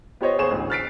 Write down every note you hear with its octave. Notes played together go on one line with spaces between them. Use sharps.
B3 G4 C5 C#5 D#5
D#2 G#4 C5 C#6 E7
A1 D2
F6 F#6 A6 B6 C7 D7